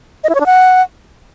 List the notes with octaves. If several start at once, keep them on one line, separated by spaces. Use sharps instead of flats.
D#5
E4
C#5
D4
F#5